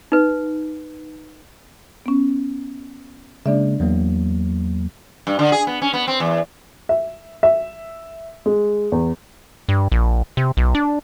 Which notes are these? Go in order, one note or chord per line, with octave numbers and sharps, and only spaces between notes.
D#4 B4
B3 C#4
C#3 G#3 A#3 D4 D5 E5
E2 F#3 A#3
G2
D3
G#4
B3
C#4
B3
C4
E2
E5
E5
G#3
E2
G2
A#1
C3
B1
D4